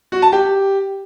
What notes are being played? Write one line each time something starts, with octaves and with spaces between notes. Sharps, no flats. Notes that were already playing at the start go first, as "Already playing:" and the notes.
F#4
A5
G4